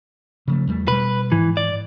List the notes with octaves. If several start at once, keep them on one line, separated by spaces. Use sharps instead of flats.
C#3 F3 A3
E2 G3 A3
B2 G3 B4
G#2 E3
D5